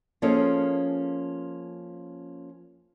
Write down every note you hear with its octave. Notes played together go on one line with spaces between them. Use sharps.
F3 A#3 C#4 G#4 A4 D#5